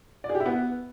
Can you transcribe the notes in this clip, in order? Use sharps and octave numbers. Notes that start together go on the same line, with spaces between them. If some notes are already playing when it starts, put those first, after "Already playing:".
D5
G#4
G4
E4
B3